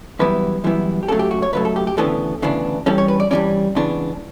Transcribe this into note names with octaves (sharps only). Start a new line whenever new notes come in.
F#2 E3 G3 B3 E4 B4
F#2 E3 G3 B3 E4
G4
C#2 C#3 F#3 A3 A4
G4
F#4
C#5
C#2 C#3 F#3 A3 B4
A4
G4
G4
D2 C#3 E3 B3 D4 A4
D2 C#3 E3 B3 D4
G2 E3 G3 C#4 A4
C#5
B4
D5
G2 E3 G3 C#4 D5
C#2 C#3 E3 B3 D4